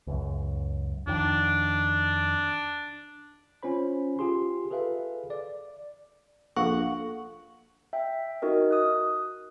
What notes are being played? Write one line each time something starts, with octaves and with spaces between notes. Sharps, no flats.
C#2 F#2
F2 D#3 D4
C#4 F4 C5 B5
F4 G4 G#4 C6
G#4 A4 B4 E5 F5
D5
A#1 A4 F5 F#5 C#6
E5 G5
D#4 F#4 A#4 D#5
D#6 F#6